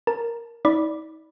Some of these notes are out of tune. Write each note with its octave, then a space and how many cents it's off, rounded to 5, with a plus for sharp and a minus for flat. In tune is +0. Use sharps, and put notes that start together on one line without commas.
A#4 +0 A5 +0
D#4 +40 D5 +0 B5 -10